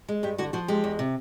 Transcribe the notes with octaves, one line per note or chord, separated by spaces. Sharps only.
G#3
G2 G4
D3 F#4
F3 F#4
G#3 G4
E2
C3